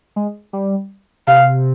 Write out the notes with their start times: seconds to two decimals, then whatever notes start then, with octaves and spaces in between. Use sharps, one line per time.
0.16 G#3
0.53 G3
1.27 C3 F5